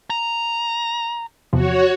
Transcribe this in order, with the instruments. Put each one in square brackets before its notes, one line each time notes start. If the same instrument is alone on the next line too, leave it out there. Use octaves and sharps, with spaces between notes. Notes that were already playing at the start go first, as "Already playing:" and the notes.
[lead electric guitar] A#5
[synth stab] E2 C3 F3 [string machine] F#4 C#5